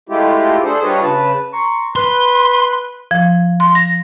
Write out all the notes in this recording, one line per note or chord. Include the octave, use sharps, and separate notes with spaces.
G#3 A3 E4 F4 G4
D4 G#4 A4 C5
G3 D4 F4 B4 C#5 D#5
C#3 B4 A5
A#5 C6 C#6
B4 C6
F3
C6
A#6